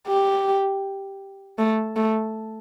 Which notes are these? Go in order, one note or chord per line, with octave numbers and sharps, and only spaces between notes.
G4
A3
A3